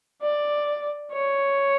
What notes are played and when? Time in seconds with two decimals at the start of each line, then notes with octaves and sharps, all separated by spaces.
0.22 D5
1.12 C#5